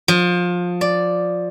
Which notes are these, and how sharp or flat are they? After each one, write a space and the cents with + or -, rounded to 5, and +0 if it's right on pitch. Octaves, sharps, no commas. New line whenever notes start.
F3 +20
D5 +0